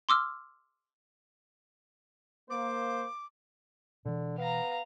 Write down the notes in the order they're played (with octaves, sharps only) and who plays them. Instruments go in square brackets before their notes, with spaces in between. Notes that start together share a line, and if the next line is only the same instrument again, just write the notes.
[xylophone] C6 D6 E6 F6
[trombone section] A#3 [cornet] C5 [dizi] D6
[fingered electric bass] B2 E3 [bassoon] D3
[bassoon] B3 [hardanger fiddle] F5 A#5